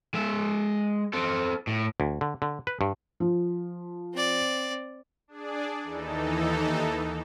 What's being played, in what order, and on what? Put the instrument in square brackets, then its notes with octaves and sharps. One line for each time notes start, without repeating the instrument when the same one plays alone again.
[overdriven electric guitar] G#3 E5
C4 A4
A2
[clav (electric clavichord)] D2
D3
D3
B4
G2
[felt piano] F3
[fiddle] C4 D5
[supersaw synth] D4 G#4 D5
D#2 E3 D#4 A4